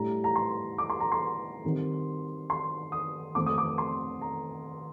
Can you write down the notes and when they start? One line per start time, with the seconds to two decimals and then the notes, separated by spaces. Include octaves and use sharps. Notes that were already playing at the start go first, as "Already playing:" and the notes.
Already playing: A2 G3 D4 A#5
0.24 A#5
0.36 C6
0.78 D6
0.90 C6
1.00 A#5
1.12 C6
1.64 D#3 G3 C4 D#4
2.50 C6
2.92 D#6
3.35 F2 D#3 A3 C4 D6
3.46 D#6
3.58 D6
3.78 C6
4.21 A#5